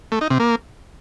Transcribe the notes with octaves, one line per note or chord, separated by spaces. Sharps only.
A3
D#4
C3
A#3